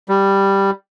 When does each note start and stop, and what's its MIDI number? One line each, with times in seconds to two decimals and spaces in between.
0.09 0.71 55